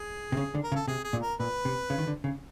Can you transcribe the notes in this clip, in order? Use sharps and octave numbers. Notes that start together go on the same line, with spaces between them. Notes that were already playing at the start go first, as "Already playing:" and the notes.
Already playing: G#4
C3
C#3
D3
A#4
C#3
A4
C3 G#4
G#4
A#2
A#4
A#2 B4
C3
C#3
D#3
D3
C#3